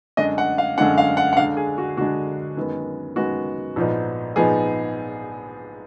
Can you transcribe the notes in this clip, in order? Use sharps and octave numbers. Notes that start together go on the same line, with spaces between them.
F#2 D3 G#3 D4 D#5
F#5
F5
F#2 D3 G#3 D4 F#5
F5
F#5
F#5
D2 D3 G#3 D4 F5
G#4
F#4
D2 D3 G#3 D4 F#4
F#2 D#3 G#3 B3
F#2 D#3 G#3 B3 F#4
A#1 G#2 F3 B3 D#4
A#1 G#2 F3 B3 D#4 G#4